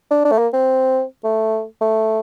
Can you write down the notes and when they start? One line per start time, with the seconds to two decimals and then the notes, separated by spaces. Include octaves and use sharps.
0.11 D4
0.25 D4
0.32 A3
0.38 A#3
0.53 C4
1.24 A3
1.81 A3